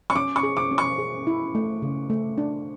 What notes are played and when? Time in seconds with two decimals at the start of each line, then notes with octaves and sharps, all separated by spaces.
0.10 C#6
0.15 C#4 D6
0.36 C#6
0.43 G#4
0.57 D6
0.71 C#4
0.78 C#6
0.98 G#4
1.27 E4
1.55 A3
1.82 C#3
2.10 A3
2.38 D4